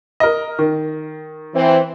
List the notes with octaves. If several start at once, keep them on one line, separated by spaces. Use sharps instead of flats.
A#4 D#5
D#3
E3 C4